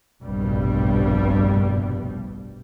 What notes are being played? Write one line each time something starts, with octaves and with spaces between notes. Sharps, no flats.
F1 A#1 G2 B2 G3